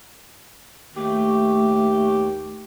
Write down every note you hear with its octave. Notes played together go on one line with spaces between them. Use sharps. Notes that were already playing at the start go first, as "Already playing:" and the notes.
D#2 A3 G4